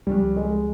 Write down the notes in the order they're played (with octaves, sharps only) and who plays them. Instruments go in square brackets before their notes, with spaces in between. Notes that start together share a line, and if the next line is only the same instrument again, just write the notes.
[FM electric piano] C#2 C3 F3 [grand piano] G3
[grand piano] G#3